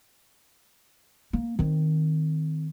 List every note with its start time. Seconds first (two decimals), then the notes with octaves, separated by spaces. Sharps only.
1.33 A#3
1.59 D#3 C4